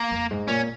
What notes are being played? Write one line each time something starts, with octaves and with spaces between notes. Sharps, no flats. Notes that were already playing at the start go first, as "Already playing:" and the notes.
Already playing: A#3
F2
G#2
A#2 C#4